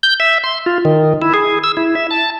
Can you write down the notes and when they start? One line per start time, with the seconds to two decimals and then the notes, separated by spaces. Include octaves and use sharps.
0.03 G6
0.20 E5
0.44 C6
0.66 F4
0.85 D#3
1.22 E4
1.34 G#4
1.64 E6
1.77 E4
1.95 E5
2.11 A5